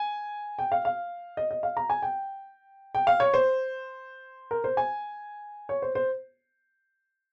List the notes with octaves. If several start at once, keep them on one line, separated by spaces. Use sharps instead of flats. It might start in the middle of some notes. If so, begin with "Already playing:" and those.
Already playing: G#5
G5
F5
F5
D#5
D#5
F5
A#5
G#5
G5
G5
F5
C#5
C5
A#4
C5
G#5
C#5
C5
C5